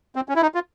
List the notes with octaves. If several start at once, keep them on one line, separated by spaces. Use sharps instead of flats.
C4
C#4
E4
D#4
F4